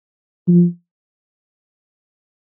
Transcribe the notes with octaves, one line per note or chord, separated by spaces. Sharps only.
F3